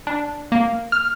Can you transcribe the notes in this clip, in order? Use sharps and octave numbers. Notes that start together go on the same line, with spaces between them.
D4
A#3
F6